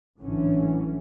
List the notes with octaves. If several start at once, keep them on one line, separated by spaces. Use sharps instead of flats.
A1 G#2 D3 E3 F#3 C#4